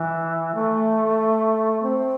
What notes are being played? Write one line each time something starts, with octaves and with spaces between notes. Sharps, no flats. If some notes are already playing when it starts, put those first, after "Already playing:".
Already playing: E3
A3
C4